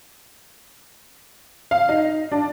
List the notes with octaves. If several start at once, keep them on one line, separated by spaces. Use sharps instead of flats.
F5
D#4
D4